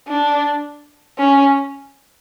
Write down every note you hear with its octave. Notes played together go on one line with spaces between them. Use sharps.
D4
C#4